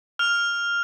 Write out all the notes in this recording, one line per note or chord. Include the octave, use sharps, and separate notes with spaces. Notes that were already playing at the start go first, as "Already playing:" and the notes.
F6 F7